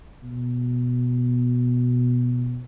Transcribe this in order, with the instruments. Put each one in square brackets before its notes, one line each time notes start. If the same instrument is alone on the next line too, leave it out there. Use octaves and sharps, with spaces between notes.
[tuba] B2